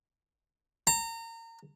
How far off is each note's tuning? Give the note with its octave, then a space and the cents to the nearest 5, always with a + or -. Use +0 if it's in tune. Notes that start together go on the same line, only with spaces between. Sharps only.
A#5 -30